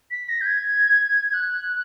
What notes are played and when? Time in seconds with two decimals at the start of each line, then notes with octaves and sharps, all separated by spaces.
0.11 B6
0.29 A#6
0.41 G6
0.46 G#6
1.34 F#6